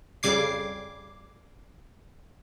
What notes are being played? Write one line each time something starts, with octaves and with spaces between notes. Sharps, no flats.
F2 C#3 G3 D6 G#6 C7